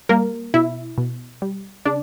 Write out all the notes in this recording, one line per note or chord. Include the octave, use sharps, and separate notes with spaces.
G3 A#3 A#4
B2 E4 E5
B2
G3
C#3 D4 D5